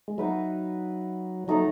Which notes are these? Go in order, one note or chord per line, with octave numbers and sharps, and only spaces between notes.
G#3
F#3 D#4 F#4 B4 E5
F#3 A3 D#4 A4